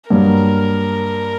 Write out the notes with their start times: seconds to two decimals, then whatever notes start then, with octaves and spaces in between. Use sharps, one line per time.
0.10 G2 F#3 A#3 A#4